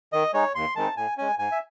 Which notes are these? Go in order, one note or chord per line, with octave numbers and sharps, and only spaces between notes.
D#3 D#5
G#3 D#4 C#5
D#2 C6
D#3 G#3 C4 D#4 A5
A2 G#5
G#3 C#4 G#5
G#2 G#5
E5